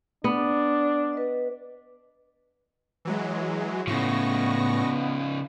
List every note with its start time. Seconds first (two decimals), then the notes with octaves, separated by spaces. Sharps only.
0.24 B3 D4
1.13 B4 D#5
3.05 E3 F#3 G#3
3.87 A2 C#3 F3 B3 C#6 A#6